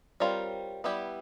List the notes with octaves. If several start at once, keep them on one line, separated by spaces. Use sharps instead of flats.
G3 C4 F4 A#4 C#5
G3 B3 E4 G4